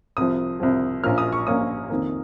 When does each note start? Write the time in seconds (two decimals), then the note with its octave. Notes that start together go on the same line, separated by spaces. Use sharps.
0.17 C2 C3 F3 D#6
0.60 C2 C3 F3
1.04 A#1 A#2 F3 A#3 C#4 F6
1.18 D#6
1.32 C#6
1.47 A#1 A#2 F3 A#3 C#4 D#6
1.90 F2 D#3 A#3